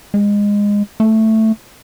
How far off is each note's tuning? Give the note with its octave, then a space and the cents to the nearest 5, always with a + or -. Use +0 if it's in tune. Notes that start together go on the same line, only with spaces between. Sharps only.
G#3 -20
A3 +5